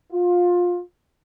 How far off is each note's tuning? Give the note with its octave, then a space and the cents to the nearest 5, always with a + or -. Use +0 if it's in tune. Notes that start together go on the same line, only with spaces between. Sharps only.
F4 +20